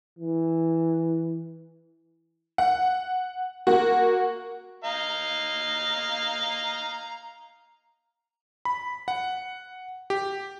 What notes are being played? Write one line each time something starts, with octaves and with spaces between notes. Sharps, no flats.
E3
F#5
A#3 F#4
D#5 F5 A#5
B5
F#5
G4